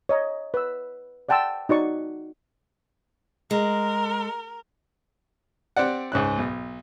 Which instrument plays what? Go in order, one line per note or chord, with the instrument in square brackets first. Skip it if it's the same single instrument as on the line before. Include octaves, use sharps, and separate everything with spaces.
[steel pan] C#5 D#5 A#5
B4 E6
D5 F#5 G5 A5 C6 E6
D#4 F#4 D5 C#6
[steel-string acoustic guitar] G#3 [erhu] A#4
[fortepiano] C4 G4 D5 F#5
C#2 G#2 C#4 F#6
B1